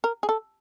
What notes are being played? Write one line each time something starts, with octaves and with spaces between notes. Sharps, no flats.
A#4
G#4
A4